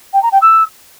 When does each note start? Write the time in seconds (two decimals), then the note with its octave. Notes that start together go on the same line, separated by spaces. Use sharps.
0.13 G5
0.23 A#5
0.32 G5
0.42 E6